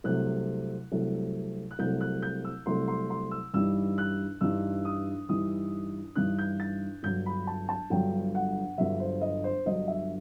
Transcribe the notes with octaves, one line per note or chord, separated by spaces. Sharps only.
C2 C3 F#3 A3 F#6
C2 C3 F#3 A3
F#6
C2 C3 F#3 A3 G6
F#6
G6
E6
C2 C3 F#3 A3 C6
C6
C6
E6
G2 E3 G3 D#4 E6
F#6
G2 E3 G3 D#4 E6
D#6
G2 E3 G3 D#4 D#6
G2 E3 G3 D#4 F#6
G6
A6
G1 G2 F#3 G6
B5
A5
A5
G1 G2 F#3 G5
F#5
G1 G2 F#3 E5
C5
D#5
C5
G1 G2 F#3 D#5
E5